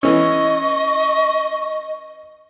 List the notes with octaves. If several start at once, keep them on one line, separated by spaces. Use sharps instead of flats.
E3 C#4 D#5 C#6